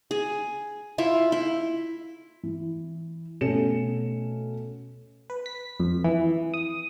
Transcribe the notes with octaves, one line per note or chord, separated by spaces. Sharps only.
G#4
E4 F4 E5
E4
E3
B2 A3 C#4 A4 C#7 E7
B4
B6
F2
E3
D#6